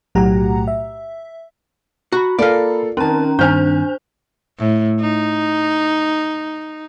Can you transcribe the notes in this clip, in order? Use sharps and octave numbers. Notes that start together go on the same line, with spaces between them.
B1 A2 F#3 G4 F#5 A#5
E5
F#4 A#5 B5
A#3 F4 A4 D5 F5
D#3 C4 C#4 A#4 A5 A#5
G2 D#3 C4 D4 C5 G#5 F6 G6
A2
D#4